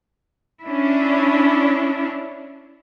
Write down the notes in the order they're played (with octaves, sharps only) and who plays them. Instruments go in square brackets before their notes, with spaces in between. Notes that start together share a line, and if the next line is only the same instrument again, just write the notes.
[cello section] C#4 D4 E4